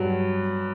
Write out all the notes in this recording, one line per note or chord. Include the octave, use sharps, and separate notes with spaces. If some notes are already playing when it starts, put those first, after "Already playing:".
Already playing: G2 F#3